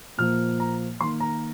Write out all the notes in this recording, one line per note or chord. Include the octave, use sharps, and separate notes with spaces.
A#2 F3 A#3 F6
A#5
D#3 A#3 C6
A#5